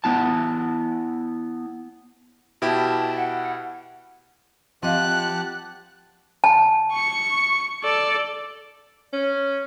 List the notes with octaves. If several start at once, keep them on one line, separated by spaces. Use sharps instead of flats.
B3 E4 A5
B2 E4 G4 A5
F#5
F3 C4 G4 D#5 F5 F#5 A5 F#6
A5
C#6 C#7
A4 D5
C#4